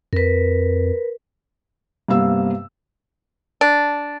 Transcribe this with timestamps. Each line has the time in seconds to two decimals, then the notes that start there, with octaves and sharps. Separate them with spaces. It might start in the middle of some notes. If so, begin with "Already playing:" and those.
0.13 F2 A#4 B4
2.08 G2 C3 A#3 B3 F5 E6
3.61 D4